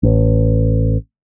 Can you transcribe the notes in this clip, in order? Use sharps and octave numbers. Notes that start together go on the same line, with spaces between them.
A1